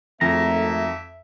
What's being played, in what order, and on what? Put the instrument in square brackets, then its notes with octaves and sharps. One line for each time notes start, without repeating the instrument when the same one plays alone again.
[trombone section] G#1 A3 [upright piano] F2 [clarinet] E5 [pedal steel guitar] A#5